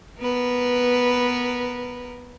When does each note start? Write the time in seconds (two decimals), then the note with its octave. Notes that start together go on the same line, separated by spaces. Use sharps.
0.20 B3 A#4 B4